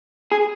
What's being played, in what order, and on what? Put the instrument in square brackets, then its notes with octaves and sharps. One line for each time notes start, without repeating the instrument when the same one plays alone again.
[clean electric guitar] G#4